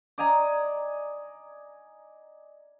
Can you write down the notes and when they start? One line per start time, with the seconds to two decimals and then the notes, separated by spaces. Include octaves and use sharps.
0.18 D5 D#5 G#5 A#5